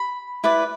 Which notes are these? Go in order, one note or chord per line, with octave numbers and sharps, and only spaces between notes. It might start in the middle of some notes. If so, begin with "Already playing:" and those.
Already playing: B5
E4 B4 D5